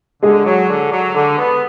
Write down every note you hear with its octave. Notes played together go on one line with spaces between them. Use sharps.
D3 G#3 G#4
F#3
D3
F#3
D3
B3